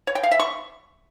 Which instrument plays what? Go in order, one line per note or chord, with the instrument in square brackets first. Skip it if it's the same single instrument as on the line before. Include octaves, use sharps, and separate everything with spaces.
[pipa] C#5
G5
F5
E5
C#6